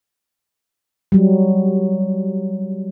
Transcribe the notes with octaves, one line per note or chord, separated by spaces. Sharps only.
F#3 G3